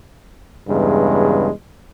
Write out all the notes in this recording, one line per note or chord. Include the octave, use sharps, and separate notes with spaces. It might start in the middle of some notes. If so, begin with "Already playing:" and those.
E2 G2 C#3 G#3